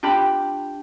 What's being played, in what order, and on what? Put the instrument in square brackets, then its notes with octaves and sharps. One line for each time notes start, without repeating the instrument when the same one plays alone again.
[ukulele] D4 F4 G4 B5